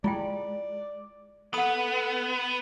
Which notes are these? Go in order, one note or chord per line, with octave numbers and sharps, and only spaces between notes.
G#3 E4 F4 D5 G5
B3 A4 F#5 D#6